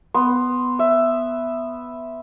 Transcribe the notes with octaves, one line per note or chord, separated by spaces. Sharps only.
B3 C6
E5